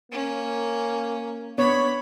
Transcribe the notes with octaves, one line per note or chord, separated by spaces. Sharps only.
A#3 C#4
B3 D4 C#5 B5